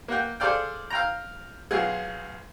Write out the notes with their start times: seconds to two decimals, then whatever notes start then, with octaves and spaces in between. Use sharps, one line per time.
0.08 A#3 F#5 G5
0.40 G#4 A4 C5 D5 F5 G5
0.90 F5 G5 A#5
1.71 B1 F4 F#4 G#4